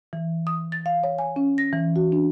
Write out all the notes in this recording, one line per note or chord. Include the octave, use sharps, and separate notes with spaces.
E3
D#6
A6
F5
C#5
G#5
C#4
A#6
E3
F#4
D4